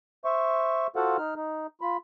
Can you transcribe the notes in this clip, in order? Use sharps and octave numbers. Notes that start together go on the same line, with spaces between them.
C5 E5 C#6
F4 F#4 A4 C5 F5 F#5
D#4 F6
D#4
F4 B5